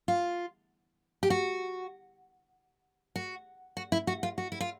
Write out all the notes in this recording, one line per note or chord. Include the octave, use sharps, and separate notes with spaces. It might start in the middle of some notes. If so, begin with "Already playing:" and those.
F4
G4
F#4
F#4
F#4
E4
F#4
F4
F#4
E4
F4